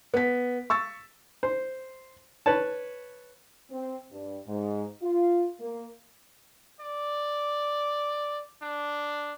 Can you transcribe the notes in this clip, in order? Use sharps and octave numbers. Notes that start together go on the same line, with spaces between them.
B3 B6
C#6 E6 A6
C5
B4 C#5 A5
C4
G2
G#2
F4
A#3
D5
D4